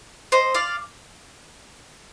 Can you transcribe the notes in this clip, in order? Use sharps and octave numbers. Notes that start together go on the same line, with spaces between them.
C5 D#5
D5 F5